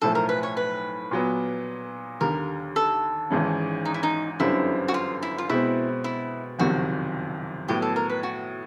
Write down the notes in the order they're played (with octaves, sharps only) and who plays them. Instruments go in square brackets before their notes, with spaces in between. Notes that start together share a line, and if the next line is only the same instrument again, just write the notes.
[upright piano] B1 A2 F3 A3 [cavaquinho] A4
[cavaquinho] A#4
B4
C#5
B4
[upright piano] A#2 F#3 B3
[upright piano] D#2 D3 G3 [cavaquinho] A#4
[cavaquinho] A4
[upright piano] G#1 G#2 E3 G#3 C#4
[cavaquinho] D#4
E4
D#4
[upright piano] G1 F#2 D3 G3 C4 [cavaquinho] E4
[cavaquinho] F#4
F4
E4
F4
[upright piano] B2 G#3 C4 [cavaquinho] E4
[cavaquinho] E4
[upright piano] F#1 F2 C3 D#3 [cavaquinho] F#4
[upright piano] A2 F#3 B3 [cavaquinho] G4
[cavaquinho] A4
A#4
B4
F#4